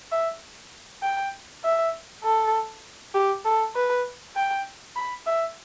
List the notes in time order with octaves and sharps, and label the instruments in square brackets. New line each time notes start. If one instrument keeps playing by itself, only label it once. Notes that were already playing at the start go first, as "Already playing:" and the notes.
[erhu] E5
G5
E5
A4
G4
A4
B4
G5
B5
E5